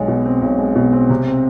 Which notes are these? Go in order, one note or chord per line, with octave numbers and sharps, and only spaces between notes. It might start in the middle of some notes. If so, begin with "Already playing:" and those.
Already playing: B1 G#3
B2
C4
B1
G#3
B2
C4
C3
C4